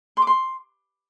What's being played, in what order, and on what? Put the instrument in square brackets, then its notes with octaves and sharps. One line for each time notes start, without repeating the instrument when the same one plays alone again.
[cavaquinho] C6
D6
C6